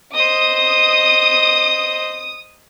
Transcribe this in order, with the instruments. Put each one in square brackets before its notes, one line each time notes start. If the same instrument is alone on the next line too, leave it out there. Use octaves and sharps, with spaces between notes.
[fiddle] C5 D#5 [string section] D#6